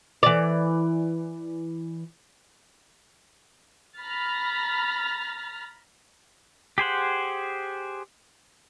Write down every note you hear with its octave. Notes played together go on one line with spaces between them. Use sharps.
E3 D5
A#5 B5 F6 A6
G4 G#4 C5 F#5